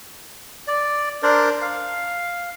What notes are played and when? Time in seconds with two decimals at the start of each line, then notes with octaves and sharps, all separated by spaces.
0.68 D5
1.23 D4 A#4 C5 D5
1.62 F5